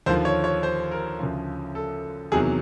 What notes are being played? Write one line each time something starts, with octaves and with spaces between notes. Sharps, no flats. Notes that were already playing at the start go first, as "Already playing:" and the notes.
D#2 D3 F3 C5
C#5
C#5
C5
A#4
D2 C#3 F3
A4
E2 C3 D#3 F#3 G#4